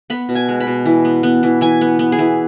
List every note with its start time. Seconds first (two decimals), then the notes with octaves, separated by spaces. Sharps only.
0.10 B3 B5
0.29 B2
0.35 G#5
0.48 G#3
0.60 B5
0.67 B2
0.86 E3
1.05 B3
1.23 B3
1.43 E3
1.61 E3 G#5
1.81 B3
1.99 B3
2.12 G#4
2.19 E3